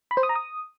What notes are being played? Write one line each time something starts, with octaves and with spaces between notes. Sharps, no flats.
B5
C5
D#6
A#5
D#6